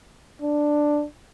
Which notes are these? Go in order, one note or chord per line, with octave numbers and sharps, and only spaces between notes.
D4